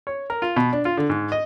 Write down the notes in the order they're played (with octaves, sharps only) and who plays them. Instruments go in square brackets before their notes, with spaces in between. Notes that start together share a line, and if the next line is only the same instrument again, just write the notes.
[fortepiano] C#5
A#4
F4
B2
D4
F4
D3
G#2
D#5